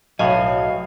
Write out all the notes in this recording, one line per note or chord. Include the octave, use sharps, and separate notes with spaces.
B1 A2 F#3 D#5 F5 G#5